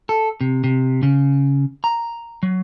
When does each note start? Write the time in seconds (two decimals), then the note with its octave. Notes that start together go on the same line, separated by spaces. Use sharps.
0.09 A4
0.41 C3
0.64 C3
1.03 C#3
1.84 A#5
2.43 F#3